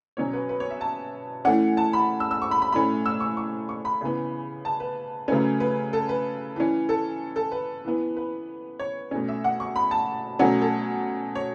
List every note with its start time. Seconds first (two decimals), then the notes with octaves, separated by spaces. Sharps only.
0.17 B2 F#3 C#4 C#5
0.33 B4
0.49 B4
0.60 C#5
0.70 E5
0.81 A5
1.45 E3 A3 C#4 F#5
1.77 A5
1.93 B5
2.20 E6
2.31 E6
2.42 C#6
2.51 B5
2.62 B5
2.72 A2 A3 C#4 B5
3.06 E6
3.20 C#6
3.37 C#6
3.69 C#6
3.85 B5
4.01 C#3 E3 B3
4.65 A5
4.80 B4
5.28 C#3 F#3 A3 C#4 B4
5.60 B4
5.93 A4
6.09 B4
6.56 E3 C#4
6.89 A4
7.36 A4
7.52 B4
7.85 E3 B3
8.17 B4
8.79 C#5
9.11 B2 A3 C#4
9.28 E5
9.44 F#5
9.60 C#6
9.76 B5
9.91 A5
10.39 B2 F#3 A3 C#4 F#5
10.61 A4
11.35 C#5